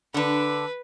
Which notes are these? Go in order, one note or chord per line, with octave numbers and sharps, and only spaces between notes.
D3 D4 B4